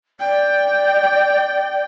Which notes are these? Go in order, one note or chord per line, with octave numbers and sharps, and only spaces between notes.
D5 G5